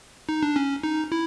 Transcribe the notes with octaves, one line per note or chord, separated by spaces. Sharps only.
D#4
D4
C#4
D#4
E4